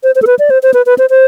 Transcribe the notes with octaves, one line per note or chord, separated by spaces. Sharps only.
C5
C5
A4
B4
D5
C5
C5
B4
B4
C5
C5